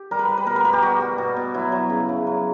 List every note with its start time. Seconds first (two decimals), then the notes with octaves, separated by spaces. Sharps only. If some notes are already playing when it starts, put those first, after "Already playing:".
Already playing: G4
0.11 G3 A#4
0.19 B4
0.28 G3
0.37 B4
0.46 B2 A#4
0.56 B4
0.65 B2 A#4
0.73 G4
0.82 G3 F#4
1.00 G3
1.18 B2
1.36 B2
1.54 F#3 E4
1.72 F#3
1.90 C#3
2.09 C#3
2.27 F#3